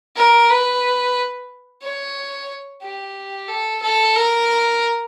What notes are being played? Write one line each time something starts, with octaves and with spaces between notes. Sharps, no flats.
A#4
B4
C#5
G4
A4
A4
A#4